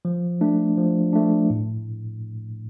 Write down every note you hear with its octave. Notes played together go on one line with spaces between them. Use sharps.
F3
A3 D4
F3
A3 D4
A2